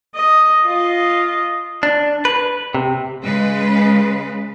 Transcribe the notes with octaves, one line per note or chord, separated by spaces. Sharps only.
D#5
F4 D#5
D4
B4
C3
C#3 G#3 B4